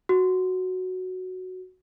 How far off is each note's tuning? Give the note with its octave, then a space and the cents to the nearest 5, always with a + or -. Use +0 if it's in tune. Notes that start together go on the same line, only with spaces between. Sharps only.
F#4 +0